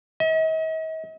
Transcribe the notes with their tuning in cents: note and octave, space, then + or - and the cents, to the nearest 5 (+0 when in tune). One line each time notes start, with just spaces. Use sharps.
D#5 +45